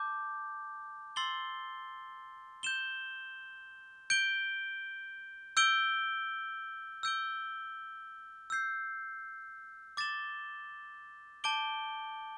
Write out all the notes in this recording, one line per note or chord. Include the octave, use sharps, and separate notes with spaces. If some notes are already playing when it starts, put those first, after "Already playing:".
Already playing: A5 D6 G6
C6 E6 A6 C7 G7
G6 E7 G7
G6 D7 G7
E6 G6 D7 G7
E6 G6 D7 G7
E6 G6 C7
D6 A6 E7 G7
A5 D6 G6 D7 G7